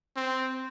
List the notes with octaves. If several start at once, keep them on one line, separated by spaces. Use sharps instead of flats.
C4